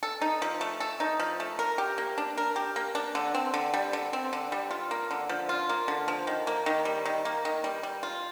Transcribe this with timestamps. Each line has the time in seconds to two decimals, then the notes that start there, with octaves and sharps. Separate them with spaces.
0.03 A4
0.22 D#4
0.42 F3
0.61 A3
0.80 A4
1.00 D#4
1.19 F3
1.40 A3
1.59 A#4
1.78 G4
1.98 A#3
2.18 D4
2.37 A#4
2.56 G4
2.76 A#3
2.95 D4
3.15 D3
3.35 C4
3.54 D3
3.74 G3
3.93 D3
4.13 C4
4.33 D3
4.52 G3
4.71 F4
4.91 A#3
5.11 D3
5.29 F3
5.49 F4
5.69 A#3
5.88 D3
6.08 F3
6.27 D#3
6.47 A#3
6.66 D#3
6.85 G3
7.05 D#3
7.25 A#3
7.45 D#3
7.64 G3
7.83 G3
8.03 F4